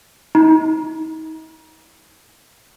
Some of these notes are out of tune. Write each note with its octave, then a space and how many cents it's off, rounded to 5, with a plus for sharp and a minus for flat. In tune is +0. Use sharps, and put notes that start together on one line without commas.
D#4 +35